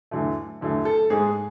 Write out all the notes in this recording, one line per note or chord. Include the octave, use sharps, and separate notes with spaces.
E2 D3 F#3 A3
E2 D3 F#3 A3
A4
G#2 G#3 G#4